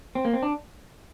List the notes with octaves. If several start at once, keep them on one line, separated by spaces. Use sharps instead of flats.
C4
A#3
C4
D4